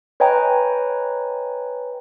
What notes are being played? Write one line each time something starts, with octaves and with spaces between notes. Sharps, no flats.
B4 C#5 D#5 G5 G#5 A#5